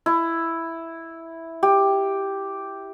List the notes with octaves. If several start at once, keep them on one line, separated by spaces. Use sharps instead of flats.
E4
G4